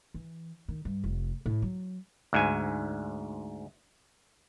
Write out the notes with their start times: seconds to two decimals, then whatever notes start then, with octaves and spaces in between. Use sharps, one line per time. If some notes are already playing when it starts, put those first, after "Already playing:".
0.14 E3
0.68 D#3
0.85 G2
1.04 F1
1.46 A2
1.62 F#3
2.33 D2 G#2 G#5